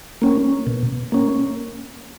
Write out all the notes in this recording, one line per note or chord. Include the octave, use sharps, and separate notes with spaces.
A#3 C#4
B2
A#3 C#4